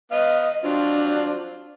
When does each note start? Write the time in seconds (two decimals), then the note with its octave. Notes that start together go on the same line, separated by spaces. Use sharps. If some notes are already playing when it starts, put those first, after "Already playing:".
0.12 B3 D#5 F5
0.63 F#3 C4 D4 F4